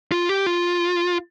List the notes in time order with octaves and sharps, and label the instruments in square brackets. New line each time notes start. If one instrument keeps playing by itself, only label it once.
[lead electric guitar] F4
G4
F4